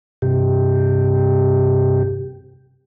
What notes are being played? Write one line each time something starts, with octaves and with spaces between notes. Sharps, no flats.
G2 C3 G4